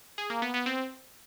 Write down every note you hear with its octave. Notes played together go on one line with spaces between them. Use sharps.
G#4
A#3
B3
B3
C4